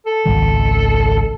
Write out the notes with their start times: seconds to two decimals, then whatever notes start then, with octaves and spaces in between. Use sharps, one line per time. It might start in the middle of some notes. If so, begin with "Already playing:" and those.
0.06 A4
0.25 G#1 C#2 D#3